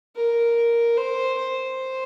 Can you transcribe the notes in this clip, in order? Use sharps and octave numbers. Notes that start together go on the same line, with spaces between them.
A#4
C5
C5